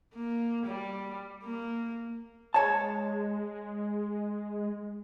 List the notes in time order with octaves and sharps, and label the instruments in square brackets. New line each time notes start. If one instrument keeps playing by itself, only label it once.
[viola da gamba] A#3
G3
A#3
[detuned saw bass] G#3 [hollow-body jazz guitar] C#5 A5